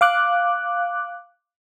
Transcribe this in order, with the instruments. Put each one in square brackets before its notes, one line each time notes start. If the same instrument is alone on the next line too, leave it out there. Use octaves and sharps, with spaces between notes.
[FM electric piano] F5 D6 F#6